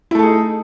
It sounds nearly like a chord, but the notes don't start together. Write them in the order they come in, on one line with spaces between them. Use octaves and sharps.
E4 A3 A4 G#4 D#4